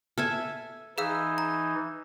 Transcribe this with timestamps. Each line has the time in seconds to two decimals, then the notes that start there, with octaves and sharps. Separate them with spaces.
0.18 A4 E5 G#5 F6
0.98 E3 D#4 G#4 F5 E6
1.38 A#5